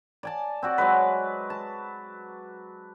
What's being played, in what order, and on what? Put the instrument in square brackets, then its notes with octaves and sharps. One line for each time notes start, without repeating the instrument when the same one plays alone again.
[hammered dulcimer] D5 G#5 A5
C4 F#4 D5
F#3 G#3 B4
A5